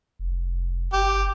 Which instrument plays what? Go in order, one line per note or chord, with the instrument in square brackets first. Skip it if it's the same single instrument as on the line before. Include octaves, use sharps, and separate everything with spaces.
[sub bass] F1
[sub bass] G1 [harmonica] G4